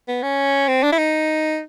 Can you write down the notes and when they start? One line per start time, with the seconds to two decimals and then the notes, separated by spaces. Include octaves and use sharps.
0.08 B3
0.23 C#4
0.68 C4
0.83 D4
0.92 E4
0.98 D#4